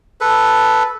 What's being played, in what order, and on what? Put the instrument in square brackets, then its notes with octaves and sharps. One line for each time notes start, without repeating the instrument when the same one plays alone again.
[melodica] A4 B4